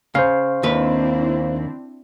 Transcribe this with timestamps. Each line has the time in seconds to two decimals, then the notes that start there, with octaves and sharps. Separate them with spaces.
0.15 C#3 C5 F5
0.63 D#2 C4 D4 E4 B4